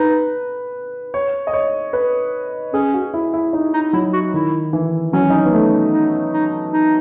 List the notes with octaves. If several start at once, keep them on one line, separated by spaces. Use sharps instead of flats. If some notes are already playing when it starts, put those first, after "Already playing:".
Already playing: D#4 B4
C#5
D#5
C#5
B4
C#4 G#4
F#4
E4
E4
D#4
D#4
F#3 E4
F#4
D#3 E4
E3
F#3 C#4
D#4
C#4
B3
A3
D#4
D#4
D#4